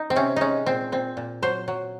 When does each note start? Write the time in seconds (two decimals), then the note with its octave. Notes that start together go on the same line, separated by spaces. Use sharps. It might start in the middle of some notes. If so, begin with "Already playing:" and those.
Already playing: D#4
0.10 C4
0.16 C3 C#4
0.36 G#3 C#4 D#4
0.66 A#2 C4
0.92 A#2 C4
1.17 A#2
1.42 F#3 C5
1.68 F#3